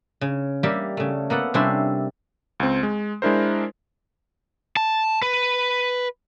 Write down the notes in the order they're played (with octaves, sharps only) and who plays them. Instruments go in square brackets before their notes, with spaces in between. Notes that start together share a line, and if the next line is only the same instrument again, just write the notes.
[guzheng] C#3
G3 A#3 G4 A#4 E5
C#3 A3
A#3 B3 A4 F#5
C3 G3 C#4 D4 E4 C5
[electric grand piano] C#2 C4
G#3
G#3 D4 E4 A#4 C5
[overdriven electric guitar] A5
B4